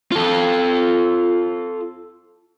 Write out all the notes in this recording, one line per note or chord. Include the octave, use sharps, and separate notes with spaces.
F4 A4